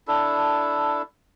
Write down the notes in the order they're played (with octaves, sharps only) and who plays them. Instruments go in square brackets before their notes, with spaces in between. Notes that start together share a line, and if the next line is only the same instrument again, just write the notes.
[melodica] D4 E4 A4